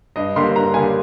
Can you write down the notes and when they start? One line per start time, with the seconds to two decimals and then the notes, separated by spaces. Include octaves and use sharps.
0.16 G2 D#5
0.36 D3 G3 A#3 C6
0.56 G2 A#5
0.74 D3 G3 A#3 G#5